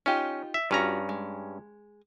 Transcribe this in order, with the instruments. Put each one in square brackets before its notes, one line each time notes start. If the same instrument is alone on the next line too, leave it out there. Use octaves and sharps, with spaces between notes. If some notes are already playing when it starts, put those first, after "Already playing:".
[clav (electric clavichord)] C#4 [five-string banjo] D#4 F4 G4
[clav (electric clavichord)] E5
[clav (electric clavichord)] G2 C#4 A#5 [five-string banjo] F4 F#4
[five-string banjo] G#3